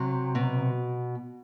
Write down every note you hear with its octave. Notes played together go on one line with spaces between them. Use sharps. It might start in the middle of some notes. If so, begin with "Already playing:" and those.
Already playing: C3 F#3
B2